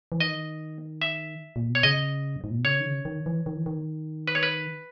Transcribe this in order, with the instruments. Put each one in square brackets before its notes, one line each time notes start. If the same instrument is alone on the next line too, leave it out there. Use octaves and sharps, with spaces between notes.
[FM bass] E3
[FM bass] D#3 [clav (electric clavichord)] D#5
[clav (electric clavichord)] E5
[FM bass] A#2
B2
[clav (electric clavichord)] C#5
[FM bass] C#3 [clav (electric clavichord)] D#5
[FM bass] F#2
G#2
A#2
B2
[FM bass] C#3 [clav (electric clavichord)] C#5
[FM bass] D#3
C#3
D#3
E3
D#3
E3
D#3
[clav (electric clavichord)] B4
C#5
B4